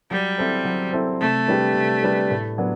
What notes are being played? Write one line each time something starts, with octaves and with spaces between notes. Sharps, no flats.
F#3 G3
C4 E4 A4 C5
F#3
C4 E4 A4 C5
C3 A3
G3 D4 G4 B4
C3
G3 D4 G4 B4
A2
F#3 B3 D4